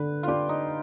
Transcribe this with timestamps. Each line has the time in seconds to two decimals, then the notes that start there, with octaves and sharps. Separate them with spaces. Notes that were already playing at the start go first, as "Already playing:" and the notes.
Already playing: D3 B4
0.23 D4 F4 G4
0.49 D#4